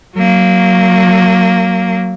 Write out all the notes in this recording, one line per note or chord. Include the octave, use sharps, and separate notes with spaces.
F#3 A#3